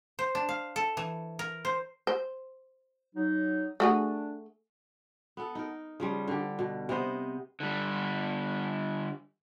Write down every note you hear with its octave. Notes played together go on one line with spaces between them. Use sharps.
C5
D4
F5
A4
E3
A#4
C5
C5
F#3 D#4
A3 D4 F#4 G#4
B3 A4
D#4 A#4
C#3 F3 G3
D3 G4
B2
C3 B3 C5 D#5
D3 G3